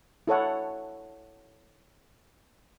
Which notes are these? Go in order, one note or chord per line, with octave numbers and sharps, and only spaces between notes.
E4 A4 C#5 F#5